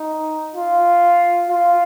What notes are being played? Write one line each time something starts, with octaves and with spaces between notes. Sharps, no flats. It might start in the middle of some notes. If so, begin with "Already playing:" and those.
Already playing: D#4
F4
F4